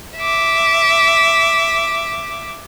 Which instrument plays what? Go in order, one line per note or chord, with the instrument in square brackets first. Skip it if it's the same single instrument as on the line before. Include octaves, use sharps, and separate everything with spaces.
[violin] E5 D6